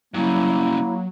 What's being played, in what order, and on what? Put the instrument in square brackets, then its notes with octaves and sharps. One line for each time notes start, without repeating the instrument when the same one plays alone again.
[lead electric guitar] G2 C#3 [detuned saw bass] F#3 [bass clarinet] A#3 [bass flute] E4